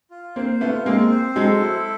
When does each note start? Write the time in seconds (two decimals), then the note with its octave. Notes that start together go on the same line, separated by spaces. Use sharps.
0.11 F4
0.36 A#3 C4 C5
0.61 A3 B3 F4
0.86 G#3 A#3 C4
1.11 C5
1.36 F#3 G#3 A4
1.61 E4